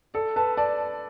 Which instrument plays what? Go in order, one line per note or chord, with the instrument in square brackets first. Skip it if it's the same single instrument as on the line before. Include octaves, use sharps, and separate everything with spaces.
[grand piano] A4 [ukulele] D5
[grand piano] B4 [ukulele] A5
[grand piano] D5 [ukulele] A5